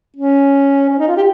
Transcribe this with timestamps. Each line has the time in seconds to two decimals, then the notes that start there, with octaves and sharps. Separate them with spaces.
0.17 C#4
0.89 C#4
0.99 D#4
1.08 F4
1.17 G4